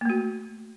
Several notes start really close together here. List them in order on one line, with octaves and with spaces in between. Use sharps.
A#3 A3 F#4